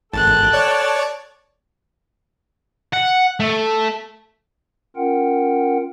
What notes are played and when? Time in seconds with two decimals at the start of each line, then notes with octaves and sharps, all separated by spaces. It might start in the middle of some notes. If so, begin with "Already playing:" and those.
0.14 G#1 A4 G5 A5 F#6
0.53 C#5 D5
2.93 F#5
3.40 A3
4.96 C#4 F4 A#4 F#5 G5